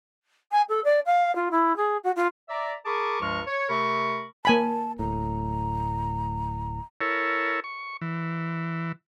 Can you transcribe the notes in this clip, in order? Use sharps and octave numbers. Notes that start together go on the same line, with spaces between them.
G#5
A4
D5
F5
F4
E4
G#4
F#4
F4
D5 E5 A#5
G#4 A#4 A5 B5 C#6 D6
C#2 G2 F3 G#3 C#6 F6
C#5
C3 A3 A#4 B5 C#6
A#3 G#5 A5 B5
D1 A2 A#5
E4 A4 A#4 C#5
C#6
E3